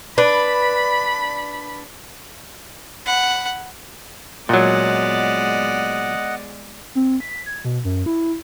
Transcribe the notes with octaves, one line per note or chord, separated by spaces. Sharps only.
D4 B4 B5
F#5 B5
A#2 F#3 G#3 B3 D5 D#5 F#5
C4
B6
G#6
B2
F#2
E4